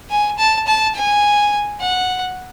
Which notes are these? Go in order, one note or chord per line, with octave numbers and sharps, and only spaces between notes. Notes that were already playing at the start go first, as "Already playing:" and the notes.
G#5
A5
A5
G#5
F#5